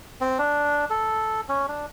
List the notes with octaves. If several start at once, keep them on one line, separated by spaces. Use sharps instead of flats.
C4
D4
A4
C#4
D4